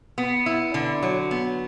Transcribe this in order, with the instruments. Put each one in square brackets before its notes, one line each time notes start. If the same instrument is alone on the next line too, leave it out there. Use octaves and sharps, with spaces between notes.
[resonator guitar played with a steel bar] B3
E4
D3
F#3
B3